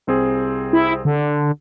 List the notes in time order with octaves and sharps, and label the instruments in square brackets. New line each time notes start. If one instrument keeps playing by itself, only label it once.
[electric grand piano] C2 C4 G#4
[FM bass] E4
D3